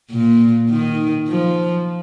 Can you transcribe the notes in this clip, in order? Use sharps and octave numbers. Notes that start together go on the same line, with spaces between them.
A#2
D#3
F3